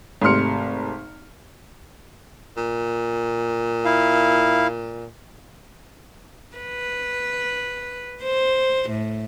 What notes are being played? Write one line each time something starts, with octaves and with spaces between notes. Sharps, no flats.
G#1 C3 A3 C6 F6 C#7
A#2
E4 F5
B4
C5
A2